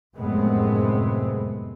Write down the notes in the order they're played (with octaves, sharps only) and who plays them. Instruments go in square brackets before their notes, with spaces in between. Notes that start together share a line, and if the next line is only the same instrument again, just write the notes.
[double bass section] F1 F#2 A2 G#3 B3 C4